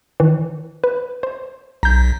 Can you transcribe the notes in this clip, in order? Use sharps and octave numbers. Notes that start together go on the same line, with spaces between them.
D#3 E3
B4
C5
B1 A#5 G6